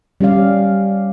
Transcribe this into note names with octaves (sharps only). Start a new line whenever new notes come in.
G3 C#4 G4 D5 F5